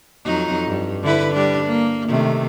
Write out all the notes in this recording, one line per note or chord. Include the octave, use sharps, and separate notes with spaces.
F2 F#3 D#4
G2
D3 E4 B4
G3 D4
A#3
C3 D#3 A3